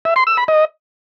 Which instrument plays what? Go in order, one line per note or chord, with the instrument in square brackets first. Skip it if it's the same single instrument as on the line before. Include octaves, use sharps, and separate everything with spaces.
[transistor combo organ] E5
C6
E6
B5
D#5